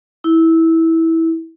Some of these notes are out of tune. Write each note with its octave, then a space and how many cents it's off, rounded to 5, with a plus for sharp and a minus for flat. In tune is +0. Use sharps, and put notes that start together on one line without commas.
E4 -15